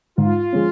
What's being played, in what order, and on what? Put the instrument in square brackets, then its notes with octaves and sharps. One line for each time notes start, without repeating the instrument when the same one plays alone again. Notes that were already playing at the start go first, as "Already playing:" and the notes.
[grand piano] G#2 [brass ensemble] F4
[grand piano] F3 G#3 C#4